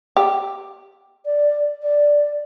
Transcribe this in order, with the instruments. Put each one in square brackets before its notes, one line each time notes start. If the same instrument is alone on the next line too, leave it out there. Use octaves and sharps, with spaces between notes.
[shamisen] G4
[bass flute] D5
D5